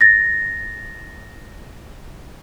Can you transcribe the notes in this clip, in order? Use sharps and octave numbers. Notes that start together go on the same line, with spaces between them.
A6 A#6